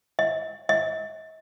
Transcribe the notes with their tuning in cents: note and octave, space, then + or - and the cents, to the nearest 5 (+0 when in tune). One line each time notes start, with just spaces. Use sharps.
D#5 +45
D#5 +45